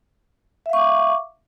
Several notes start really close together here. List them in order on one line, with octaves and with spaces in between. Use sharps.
E5 F5 C#6 D6